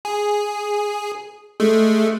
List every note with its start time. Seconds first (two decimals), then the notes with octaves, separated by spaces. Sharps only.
0.05 G#4
1.60 G#3 A3